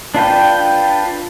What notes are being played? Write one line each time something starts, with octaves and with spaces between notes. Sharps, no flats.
D4 F4 B4 G5